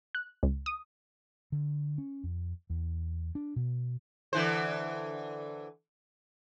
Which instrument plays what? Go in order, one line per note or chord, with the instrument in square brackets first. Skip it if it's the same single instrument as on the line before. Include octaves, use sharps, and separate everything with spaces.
[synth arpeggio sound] F#6
C#2
D#6
[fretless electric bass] D3
C#4
F2
E2
D4
B2
[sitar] D3 E3 C5